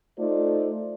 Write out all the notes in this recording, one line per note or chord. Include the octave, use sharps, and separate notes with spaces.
A3 D#4 F4 A4 C5 D5